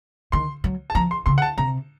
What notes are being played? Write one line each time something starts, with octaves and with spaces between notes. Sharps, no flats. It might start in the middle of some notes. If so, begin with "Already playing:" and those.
D#3 C6
F#3
A5
F3 A#5
C6
C#3 C6
F#5
A5
C3 A#5